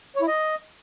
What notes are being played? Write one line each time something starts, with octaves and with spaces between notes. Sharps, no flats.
C#5
E4
D#5